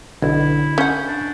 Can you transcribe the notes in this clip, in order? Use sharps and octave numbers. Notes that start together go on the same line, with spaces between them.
B1 D3 E4
C#4 F#5 G6
D4